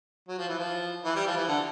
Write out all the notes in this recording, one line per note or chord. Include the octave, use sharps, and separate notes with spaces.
F#3
F3
E3
F3
E3
G3
F3
E3
D3